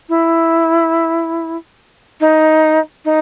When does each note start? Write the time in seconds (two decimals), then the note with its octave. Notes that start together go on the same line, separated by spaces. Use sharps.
0.09 E4
2.20 D#4
3.05 D#4